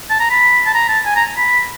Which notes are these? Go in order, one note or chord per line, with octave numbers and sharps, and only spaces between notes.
A5
A#5
B5
A5
A#5
A5
G#5
A#5
B5